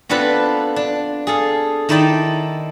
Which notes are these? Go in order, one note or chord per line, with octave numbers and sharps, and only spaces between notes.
B3 C4 D4 F4 A4 B4
D4
G#4 A4 F5
D#3 D#4 E4 D5 G5 A5